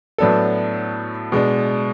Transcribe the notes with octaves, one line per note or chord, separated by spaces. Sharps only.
A2 F#3 B3 D4 A4
B2 G#3 D4